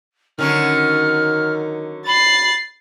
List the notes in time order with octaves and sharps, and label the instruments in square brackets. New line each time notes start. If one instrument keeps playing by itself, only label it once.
[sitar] D3 F#3 C#4 [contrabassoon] D#3 [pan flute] F6
[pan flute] B5 [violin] A6 C7